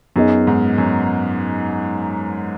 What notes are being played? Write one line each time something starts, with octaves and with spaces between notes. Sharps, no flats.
F#2 B3 D#4 G#4 D#5
G#2
F#2